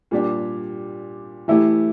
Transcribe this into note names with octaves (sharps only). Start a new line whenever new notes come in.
A#2 G3 D4 G4
E3 A3 E4 G4